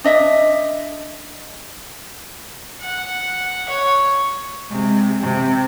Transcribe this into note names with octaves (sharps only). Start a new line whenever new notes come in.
D4 D#5 E5
F#5
C#5
C3 G#3
C3